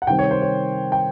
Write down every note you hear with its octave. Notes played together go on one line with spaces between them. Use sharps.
F#5
C3 D#3 G3 C4 G5
C#5
C5
C#5
G5